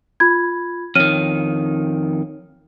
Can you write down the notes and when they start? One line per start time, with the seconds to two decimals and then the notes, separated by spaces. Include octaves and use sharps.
0.20 F4 B5 G#6
0.95 F2 D#3 C#5 F6 D#7